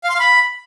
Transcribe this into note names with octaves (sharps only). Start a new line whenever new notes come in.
F5
C6
F5
B5